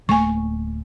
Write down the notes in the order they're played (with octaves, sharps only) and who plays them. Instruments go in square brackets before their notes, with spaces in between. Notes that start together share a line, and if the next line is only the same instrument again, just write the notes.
[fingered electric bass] D1 A3 A#3 [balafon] G#5 C#6